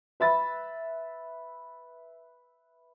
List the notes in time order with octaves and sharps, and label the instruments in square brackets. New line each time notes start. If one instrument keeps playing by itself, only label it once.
[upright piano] B4 E5 B5 A6